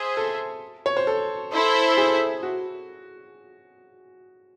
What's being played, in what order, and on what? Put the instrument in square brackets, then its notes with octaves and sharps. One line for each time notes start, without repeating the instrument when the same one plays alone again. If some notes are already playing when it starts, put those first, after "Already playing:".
Already playing: [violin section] G#4 C5 E5
[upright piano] A4
C#5
C5
A4
[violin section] E4 A4 C5 E5
[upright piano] G#4
F#4